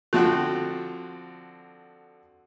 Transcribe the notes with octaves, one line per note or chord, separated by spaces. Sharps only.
D3 F3 C4 F#4 F#6